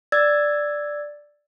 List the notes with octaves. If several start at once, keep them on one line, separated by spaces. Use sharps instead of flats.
D5 E6 G#6 A6